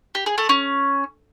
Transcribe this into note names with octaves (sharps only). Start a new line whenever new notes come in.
G4
G#4
A3
C#4